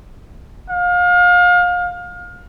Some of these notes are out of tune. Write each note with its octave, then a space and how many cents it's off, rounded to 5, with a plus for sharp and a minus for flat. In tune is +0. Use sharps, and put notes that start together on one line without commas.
F5 +30